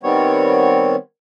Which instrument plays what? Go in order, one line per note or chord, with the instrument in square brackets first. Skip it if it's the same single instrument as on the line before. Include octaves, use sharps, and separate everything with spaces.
[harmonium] D#3 G3 B3 C4 C#5